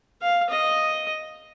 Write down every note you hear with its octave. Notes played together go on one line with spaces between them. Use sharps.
F5
D#5